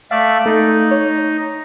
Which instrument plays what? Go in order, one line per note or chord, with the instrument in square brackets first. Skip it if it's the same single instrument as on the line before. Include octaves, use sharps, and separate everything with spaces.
[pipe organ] A3 D5 E5 [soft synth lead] F5
[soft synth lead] A3 [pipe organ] D#4
[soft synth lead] C#5